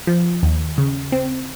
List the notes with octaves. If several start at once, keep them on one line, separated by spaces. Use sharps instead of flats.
F3
D#2
C#3
C4